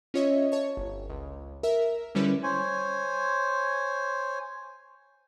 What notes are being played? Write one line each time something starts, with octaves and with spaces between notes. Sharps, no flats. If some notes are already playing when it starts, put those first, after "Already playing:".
C#4 F4 C#5 D#5 E5
C#5 A5 C#6
G1
C#2
A#4 E5
D3 G3 C#4 E4 B4
C5 C#5 G#5